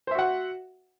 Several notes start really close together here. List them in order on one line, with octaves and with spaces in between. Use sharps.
C5 E5 F#4 F#5